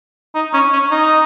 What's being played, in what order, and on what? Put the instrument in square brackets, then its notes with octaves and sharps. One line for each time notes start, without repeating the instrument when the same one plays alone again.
[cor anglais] D#4
C#4
C#4
D#4